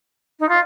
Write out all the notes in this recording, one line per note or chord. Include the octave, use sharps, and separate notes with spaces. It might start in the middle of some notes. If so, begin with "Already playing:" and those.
D#4
F4